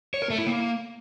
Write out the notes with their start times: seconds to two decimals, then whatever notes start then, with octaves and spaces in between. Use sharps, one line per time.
0.14 C#5
0.22 A#4
0.30 A3
0.38 E4
0.47 A#3